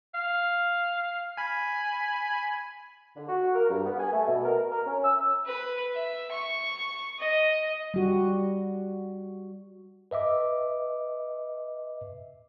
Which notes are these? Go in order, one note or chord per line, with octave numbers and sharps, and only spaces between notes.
F5
G#5 B5
D3
F#4
A#4
G2
B3
G#5
A3
B2
A#4
A#4
C#4
E6
B4
E5
C#6
D#5
G3 F#4
B4 D#5 E5 D6